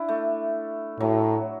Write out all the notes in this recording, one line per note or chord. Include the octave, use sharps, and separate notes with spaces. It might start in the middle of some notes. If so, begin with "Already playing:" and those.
Already playing: D4 E4
A3
A2 F#3